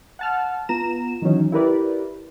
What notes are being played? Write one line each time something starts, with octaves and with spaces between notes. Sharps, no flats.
F#5 A5 F6
B3 F4 A#5 E7
D#3 E3 F#3 C#4 D#4
E4 G4 A#4 B4 D5